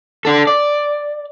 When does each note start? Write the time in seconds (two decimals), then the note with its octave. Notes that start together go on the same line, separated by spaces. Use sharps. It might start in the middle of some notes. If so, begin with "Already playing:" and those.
0.25 D4 A4
0.47 D5